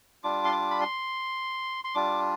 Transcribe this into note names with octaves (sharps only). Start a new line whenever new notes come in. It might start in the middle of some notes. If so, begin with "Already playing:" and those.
G3 D4 F4 D6
C6
D6
B5
C6
C6
G3 D4 F4 D6